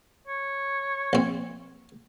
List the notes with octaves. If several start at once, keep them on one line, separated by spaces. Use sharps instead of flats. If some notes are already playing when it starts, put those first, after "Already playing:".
C#5
A#1 C4